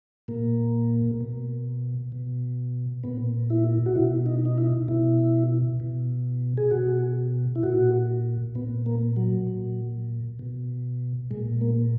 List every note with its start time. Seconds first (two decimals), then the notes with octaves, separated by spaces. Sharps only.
0.28 A#2 A#3
1.21 B2
2.12 B2
3.04 A#2 B3
3.50 E4
3.86 F#4
3.96 B2 E4
4.26 D#4
4.45 D#4
4.58 E4
4.88 B2 E4
5.80 B2
6.57 G#4
6.71 B2 F#4
7.56 E4
7.63 A#2 F#4
8.55 A#2 B3
8.86 A#3
9.16 F#3
9.47 A#2
10.39 B2
11.31 A#2 G#3
11.61 A#3